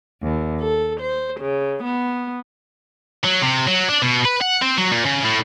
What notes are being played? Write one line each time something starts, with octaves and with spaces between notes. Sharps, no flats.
D#2
A4
C5
C#3
B3
F#3
C3
F#3
D4
B2
B4
F#5
C4
F#3
A#2
C#3
A2